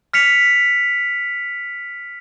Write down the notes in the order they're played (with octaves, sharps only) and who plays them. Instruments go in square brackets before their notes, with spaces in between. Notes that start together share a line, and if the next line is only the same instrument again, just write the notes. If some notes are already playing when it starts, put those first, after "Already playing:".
[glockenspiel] F6 B6 C#7 F7